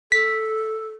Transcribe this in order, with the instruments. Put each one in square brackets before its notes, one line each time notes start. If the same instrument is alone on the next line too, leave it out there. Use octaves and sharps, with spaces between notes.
[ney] A4 [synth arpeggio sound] B6